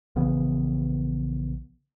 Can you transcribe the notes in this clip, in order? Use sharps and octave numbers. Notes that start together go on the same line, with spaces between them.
A#1 C#3 E3 B3